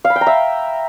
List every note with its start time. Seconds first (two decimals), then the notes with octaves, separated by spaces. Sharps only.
0.05 F5
0.10 B5
0.16 G5
0.21 A#5
0.27 E5